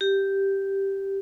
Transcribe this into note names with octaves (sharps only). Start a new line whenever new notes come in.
G4